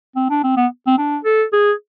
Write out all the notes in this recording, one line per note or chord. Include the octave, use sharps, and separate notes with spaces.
C4
D4
C4
B3
C4
D4
A4
G#4